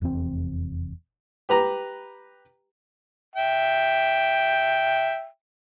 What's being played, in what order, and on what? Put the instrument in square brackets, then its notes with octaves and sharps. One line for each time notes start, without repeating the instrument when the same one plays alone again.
[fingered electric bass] F1 E2 G2 C4
[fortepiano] G4 B4 A#5
[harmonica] E5 G5